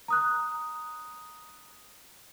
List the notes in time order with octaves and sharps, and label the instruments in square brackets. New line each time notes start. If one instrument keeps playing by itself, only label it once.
[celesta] A#5 D#6 F#6